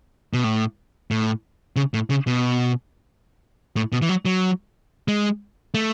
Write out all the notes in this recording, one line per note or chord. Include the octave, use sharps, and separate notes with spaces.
B2
A2
A2
C#3
A2
C#3
B2
A2
B2
E3
F#3
F#3
G#3
A3